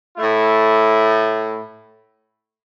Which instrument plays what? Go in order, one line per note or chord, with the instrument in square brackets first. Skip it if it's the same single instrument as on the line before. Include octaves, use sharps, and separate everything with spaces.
[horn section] A2 A3 E4